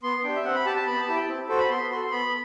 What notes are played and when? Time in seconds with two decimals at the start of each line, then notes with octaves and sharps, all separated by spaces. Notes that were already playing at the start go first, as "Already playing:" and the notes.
0.03 B3 C6
0.24 D4 G4 G5
0.36 E5
0.45 C4 F#5
0.55 B5
0.66 G4 A5
0.76 A5
0.86 B3 B5
1.00 A5
1.07 E4 G4
1.15 G5
1.28 C4
1.48 F#4 A4 C5
1.59 B5
1.70 B3 C6
1.91 F#4 A4 C6
2.11 B3 B5